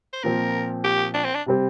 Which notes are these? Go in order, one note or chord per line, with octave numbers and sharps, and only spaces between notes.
C5
A#2 F3 C4 A#4
G4
D4
C4
D4
C3 G3 C4